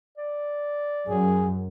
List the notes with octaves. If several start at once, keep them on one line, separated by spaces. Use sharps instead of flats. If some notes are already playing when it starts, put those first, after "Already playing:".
D5
F#2 G#4